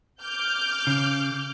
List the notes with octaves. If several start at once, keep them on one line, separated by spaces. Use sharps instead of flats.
D6 F6 G6
C#3